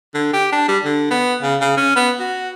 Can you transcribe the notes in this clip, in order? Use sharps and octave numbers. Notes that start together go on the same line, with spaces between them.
D3
G4
D4
G3
D3
B3
C#3
C#3
C#4
B3
F#4